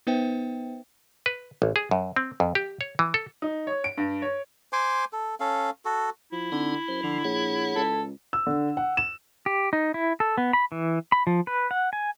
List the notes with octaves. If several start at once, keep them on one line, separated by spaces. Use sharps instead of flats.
B3 D#4 B4 C5 E5 G5
B4
A1
G#4
F#2
C4
F2
G4
C#5
E3
A4
D#4
C#5
D7
G2
C#5
C5 G#5 C6 D6
A4
C#4 A4 F5
F#4 A4
F3 E4
D3 C4 D#4
F#2 C5
D3 F3
A#1 G#4 C#5 F#5
C#2 A4
E6
D3
F#5
E7
G4
D#4
E4
A4
B3
B5
E3
B5
F3
B4
F#5
G#5